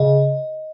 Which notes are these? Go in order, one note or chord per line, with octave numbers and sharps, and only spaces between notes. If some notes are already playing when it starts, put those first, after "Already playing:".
Already playing: C#3 D#5